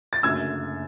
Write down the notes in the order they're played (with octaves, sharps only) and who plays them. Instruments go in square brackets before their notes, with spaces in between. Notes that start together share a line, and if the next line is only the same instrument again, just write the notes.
[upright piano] A6
F#1 F#2 D3 A3 E6 G#6